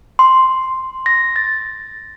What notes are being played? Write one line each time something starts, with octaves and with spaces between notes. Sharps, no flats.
C6
A#6
A6